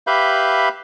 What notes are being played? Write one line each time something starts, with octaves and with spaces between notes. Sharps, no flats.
G4 B4 E5 F5 B5 G6